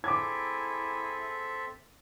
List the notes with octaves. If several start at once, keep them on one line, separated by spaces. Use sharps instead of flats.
C4 E4 G#4 A4 E5 D6 G#6